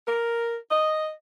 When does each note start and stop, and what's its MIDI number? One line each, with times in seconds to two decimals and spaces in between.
0.07 0.56 70
0.71 1.10 75